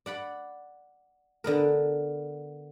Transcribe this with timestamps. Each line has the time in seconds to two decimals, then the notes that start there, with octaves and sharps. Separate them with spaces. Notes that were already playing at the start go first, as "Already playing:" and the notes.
0.06 D5 F#5 B5
1.44 D3 B3 A#4